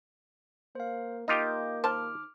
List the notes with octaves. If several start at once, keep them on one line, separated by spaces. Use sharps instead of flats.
A#3 C5 F5
A#3 D#4 F4 G4 D#5 D6 G6
D#3 C5 A5 D6 F6